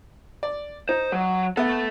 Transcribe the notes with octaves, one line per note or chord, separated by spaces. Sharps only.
D5
D#4 C5
F#3
B3 A4 E5